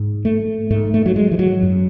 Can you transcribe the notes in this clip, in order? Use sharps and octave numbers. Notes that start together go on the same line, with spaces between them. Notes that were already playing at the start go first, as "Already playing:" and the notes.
Already playing: G#2
A3
G#2 A3
A3
F#3
G#3
E3
F#3
F#2